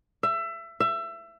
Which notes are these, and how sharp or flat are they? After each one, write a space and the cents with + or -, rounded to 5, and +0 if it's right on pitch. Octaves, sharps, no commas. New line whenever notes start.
E5 +25
E5 +25